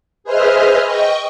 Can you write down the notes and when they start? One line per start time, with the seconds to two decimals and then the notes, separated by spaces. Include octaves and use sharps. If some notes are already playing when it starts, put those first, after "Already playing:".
0.24 G#4 B4 C5 D#5 E5 F6
0.86 D#5 G5 C#6